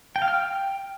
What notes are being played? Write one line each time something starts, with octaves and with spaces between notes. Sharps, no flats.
G5
F5
F6
G5